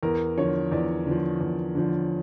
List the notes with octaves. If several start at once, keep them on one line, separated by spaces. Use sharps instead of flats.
E2 A#4
D3 F3 C#5
E2 D5
D3
F3
E2
D3 F3